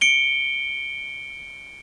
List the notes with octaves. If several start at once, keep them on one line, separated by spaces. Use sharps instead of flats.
C#7 D7 G7